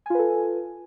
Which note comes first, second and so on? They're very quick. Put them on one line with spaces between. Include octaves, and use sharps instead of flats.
G#5 F4 B4 A4